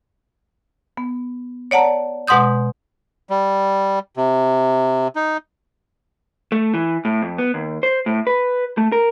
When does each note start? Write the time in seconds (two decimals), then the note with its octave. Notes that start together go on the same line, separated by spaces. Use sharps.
0.97 B3
1.71 C#5 D5 F#5 A5 A#5
2.27 B2 G#3 F#5 C6 D#6 G6
3.29 G3
4.17 C3
5.16 D#4
6.52 A3
6.74 E3
7.05 A2
7.22 F2
7.38 B3
7.54 D#2
7.83 C5
8.06 A2
8.27 B4
8.78 A3
8.92 A#4